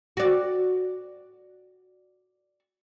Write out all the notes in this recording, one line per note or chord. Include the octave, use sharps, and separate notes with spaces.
F#4 D5